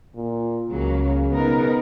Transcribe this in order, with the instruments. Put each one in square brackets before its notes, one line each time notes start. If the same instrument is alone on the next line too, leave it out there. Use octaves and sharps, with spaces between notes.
[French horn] A#2
[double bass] C#2 [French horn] C#3 [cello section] F#3 A#3
[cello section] B2 D#4 A#4 [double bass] B3